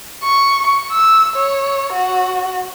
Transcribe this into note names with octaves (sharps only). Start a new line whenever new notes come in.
C#6
E6
C#5
F#4